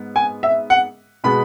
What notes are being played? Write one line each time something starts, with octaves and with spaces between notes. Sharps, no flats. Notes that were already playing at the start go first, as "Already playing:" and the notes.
Already playing: G#2 B3
G#5
E5
F#5
B2 G#3 B3 B5